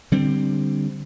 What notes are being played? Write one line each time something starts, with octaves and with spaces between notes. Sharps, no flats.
D3 G3 C4